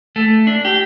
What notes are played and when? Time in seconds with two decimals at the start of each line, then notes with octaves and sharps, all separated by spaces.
0.16 A3
0.47 D4
0.65 G4